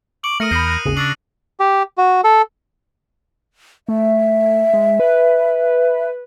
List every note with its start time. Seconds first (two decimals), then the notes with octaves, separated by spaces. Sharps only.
0.24 C#6 D6 F#7
0.40 A3 A#4 D#6 F6 A#6 C#7 D#7
0.51 E2 B5 D#6 G6 C7 D#7
0.67 F#6 D#7
0.86 G#1 D#2 C#3 G#4
0.97 D4 C#6 E6 A#6 C7 F#7
1.60 G4
1.98 F#4
2.24 A4
3.88 A3 E5
4.73 G#3
5.00 B4